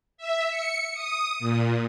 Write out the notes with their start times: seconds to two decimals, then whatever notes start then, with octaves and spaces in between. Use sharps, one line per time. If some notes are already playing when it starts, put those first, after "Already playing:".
0.18 E5
0.51 C#7
0.94 D#6
1.39 A#2